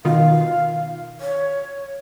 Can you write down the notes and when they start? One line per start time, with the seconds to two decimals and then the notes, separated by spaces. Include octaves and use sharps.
0.05 B2 D#3 F4 F5
1.20 C#5